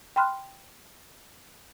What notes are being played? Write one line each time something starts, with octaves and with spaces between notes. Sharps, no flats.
G5 B5 C6 F6 F#6